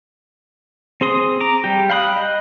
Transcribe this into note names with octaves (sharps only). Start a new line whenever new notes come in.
C4 G#4 C6 D#6
A#5 D6
G3 G4
F5 G5 B5 D#6 F#6
D#5